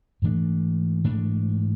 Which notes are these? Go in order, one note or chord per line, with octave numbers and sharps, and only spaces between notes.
G#2 E3 A3 D4
G#2 E3 A3 D4